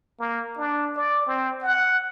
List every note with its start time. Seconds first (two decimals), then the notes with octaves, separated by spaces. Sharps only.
0.19 A#3
0.57 D4
0.96 D5
1.27 C4
1.63 F#5